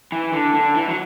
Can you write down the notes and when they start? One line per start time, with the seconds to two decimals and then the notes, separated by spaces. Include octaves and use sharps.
0.12 E3
0.34 D3
0.54 D3
0.76 E3
0.89 F#3